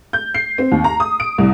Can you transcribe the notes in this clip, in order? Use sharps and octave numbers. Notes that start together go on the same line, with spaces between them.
G6
C7
C4
D#2
A#5
D#6
D7
C2